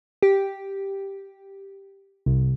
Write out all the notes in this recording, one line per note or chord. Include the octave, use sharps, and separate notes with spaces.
G4
C2